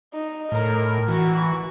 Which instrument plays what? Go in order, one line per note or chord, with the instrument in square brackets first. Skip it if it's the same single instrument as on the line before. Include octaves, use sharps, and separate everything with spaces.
[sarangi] D#4
[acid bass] A2 [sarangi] A#4
[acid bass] E3 [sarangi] F#4